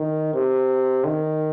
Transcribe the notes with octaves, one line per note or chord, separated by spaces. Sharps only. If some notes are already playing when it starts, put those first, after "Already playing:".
Already playing: D#3
C3
D#3